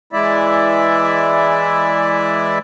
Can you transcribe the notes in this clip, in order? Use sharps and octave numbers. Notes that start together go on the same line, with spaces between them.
E3 G#3 E4 D5 E5